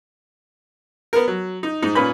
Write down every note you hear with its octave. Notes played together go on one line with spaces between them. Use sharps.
B3 A#4
F#3
D#4
G#2 D#4
A#2 C#4 B4 B5